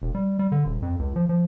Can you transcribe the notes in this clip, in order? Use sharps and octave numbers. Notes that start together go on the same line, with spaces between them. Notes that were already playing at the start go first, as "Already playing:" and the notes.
E1
G3
G3
D3
D#1
F2
C#2
F3
F3